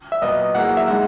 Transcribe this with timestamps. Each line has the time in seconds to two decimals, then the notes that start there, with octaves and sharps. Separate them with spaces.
0.12 E5
0.22 A#2 F#3 B3 D#5
0.55 F#3 A#3 E4 G#4 F#5
0.77 E5
0.88 G#3 D#4 F#5